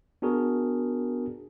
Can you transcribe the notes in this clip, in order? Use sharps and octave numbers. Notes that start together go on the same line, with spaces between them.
B3 D4 F#4 G#4 A#4